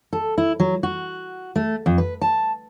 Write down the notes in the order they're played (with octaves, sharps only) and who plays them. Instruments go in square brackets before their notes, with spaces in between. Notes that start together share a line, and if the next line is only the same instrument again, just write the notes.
[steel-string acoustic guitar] A4
E4
F#3
F#4
A3
F2
B4
A5